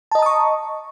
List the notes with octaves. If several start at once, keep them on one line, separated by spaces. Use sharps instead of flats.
D#5 A5 A#5 C#6 D#6